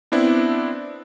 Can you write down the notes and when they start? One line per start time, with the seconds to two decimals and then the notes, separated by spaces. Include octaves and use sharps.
0.12 B3 C4 D4 E4